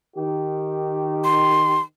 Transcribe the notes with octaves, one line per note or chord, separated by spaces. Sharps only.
D#3 G4
C6